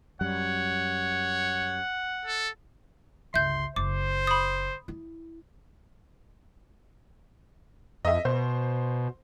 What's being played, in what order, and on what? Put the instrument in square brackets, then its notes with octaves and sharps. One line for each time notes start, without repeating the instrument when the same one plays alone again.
[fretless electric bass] F#2 G3 [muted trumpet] C#5 [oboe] F#5
[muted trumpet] A4
[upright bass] G1 C#2 [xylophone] E5 G6 [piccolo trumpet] C6
[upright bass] F#1 [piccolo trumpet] C5 [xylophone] D6
[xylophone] B5 D#6
[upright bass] E4
[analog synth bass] F2 [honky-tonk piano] D#5 E5
[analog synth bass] B2 [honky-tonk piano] C5